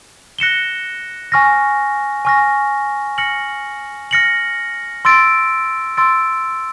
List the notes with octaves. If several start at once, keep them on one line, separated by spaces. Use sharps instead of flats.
F#6 A#6 C#7 E7 G7
G#5 C#6 F6 A#6
G#5 C#6 F6 A#6
F6 A#6 C#7 F#7
F6 A#6 C#7 F#7
C6 E6 A6 D7
C6 E6 A6 D7